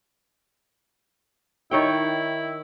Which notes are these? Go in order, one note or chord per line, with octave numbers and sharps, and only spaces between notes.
D#3 E4 C#5 G5